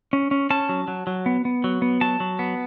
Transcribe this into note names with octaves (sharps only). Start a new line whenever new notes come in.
C#4
C#4
C#4 A5
F#3
F#3
F#3
B3
B3
F#3
B3
F#3 A5
F#3
B3